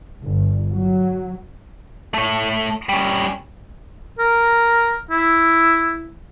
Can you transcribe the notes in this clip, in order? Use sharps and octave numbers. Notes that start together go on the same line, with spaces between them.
G1
F#3
A3 C#5
G3 C#4
A#4
E4